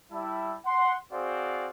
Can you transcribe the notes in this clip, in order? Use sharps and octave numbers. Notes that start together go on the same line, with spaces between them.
G3 E4 A5
F#5 C6
C4 F#4 G#4 C5 D5 F5